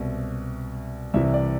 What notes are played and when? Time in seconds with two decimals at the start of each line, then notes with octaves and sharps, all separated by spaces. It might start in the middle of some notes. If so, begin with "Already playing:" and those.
Already playing: C2 B2 E5
1.14 C2 C3 E3 E5
1.34 D5